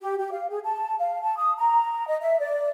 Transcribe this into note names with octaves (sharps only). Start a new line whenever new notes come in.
G4
G4
F5
G#4
A5
F5
A5
D#6
A#5
D#5
E5
D5